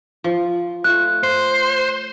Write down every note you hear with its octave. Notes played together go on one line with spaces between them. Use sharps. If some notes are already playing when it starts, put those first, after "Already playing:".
F3
A3 F4 F#6
C5